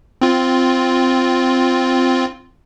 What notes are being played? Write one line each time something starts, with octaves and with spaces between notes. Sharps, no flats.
C4 F4